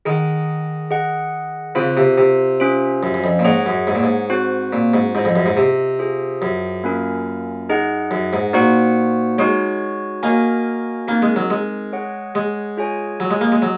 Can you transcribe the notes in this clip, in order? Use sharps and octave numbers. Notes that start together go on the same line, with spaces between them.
D#3 G#4 D#5 F#5
G#4 D#5 F#5
C#3 C4 F4 C5
C3
C3
C#4 F4 C5
F#2
F#2
F2
A#2
G#2 G#4 C#5 F#5
F#2
G#2
A#2
G#2
C4 F#4 C5
A#2
G#2
G#2 F4 C5 D#5
F2
F#2
G#2
C3
F4 G#4 C5
F#2
A#3 C#4 F4 A#4
D#4 G#4 D#5 F#5
F#2
G#2
A#2 D#4 F#4 C5 F#5
G#3 D#4 F#4 C#5
A#3 F#4 A#4 D#5 G#5
A#3 C4 D#4 A#4
G#3
F#3
G#3
G#4 C#5 F#5
G#3
F4 G#4 C#5 G#5
F#3
G#3
A#3
G#3
F#3